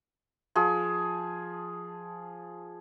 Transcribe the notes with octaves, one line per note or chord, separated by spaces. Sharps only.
F3 G#4